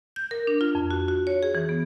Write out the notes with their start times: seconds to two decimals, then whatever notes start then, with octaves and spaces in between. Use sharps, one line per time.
0.16 G6
0.31 A#4
0.47 D4
0.61 F4
0.75 F2
0.91 F#4
1.08 F#4
1.27 C#5
1.43 G#4
1.55 E3
1.69 B3